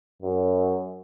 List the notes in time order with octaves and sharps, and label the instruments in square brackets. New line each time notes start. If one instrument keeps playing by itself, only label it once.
[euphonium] F#2